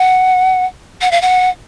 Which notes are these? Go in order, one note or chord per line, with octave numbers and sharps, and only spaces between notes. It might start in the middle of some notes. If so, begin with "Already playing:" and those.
Already playing: F#5
F#5
F5
F#5